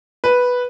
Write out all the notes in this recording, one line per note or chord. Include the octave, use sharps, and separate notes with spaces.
B4